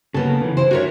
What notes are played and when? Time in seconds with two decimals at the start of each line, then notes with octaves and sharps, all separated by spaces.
0.14 C#3 A#3 B3 A4
0.42 C#3 E3
0.57 E4 C5
0.71 D4 F#4 A4 A#4 C#5 E5